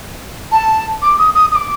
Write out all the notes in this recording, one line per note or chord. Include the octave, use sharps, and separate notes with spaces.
A5
D6
D#6
D#6
D#6
D6